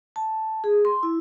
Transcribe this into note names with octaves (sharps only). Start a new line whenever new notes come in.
A5
G#4
C6
E4